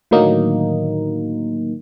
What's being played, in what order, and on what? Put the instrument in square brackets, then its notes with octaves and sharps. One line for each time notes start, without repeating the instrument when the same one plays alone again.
[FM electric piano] A2 D3 D#3 F#3 A#3 D#4